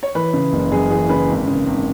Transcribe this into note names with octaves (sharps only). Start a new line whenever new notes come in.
C#5
E3 B4
C#3
F#1
F#2 G#4
E3 G#4
C#3 B4
G#1
C#3
G#1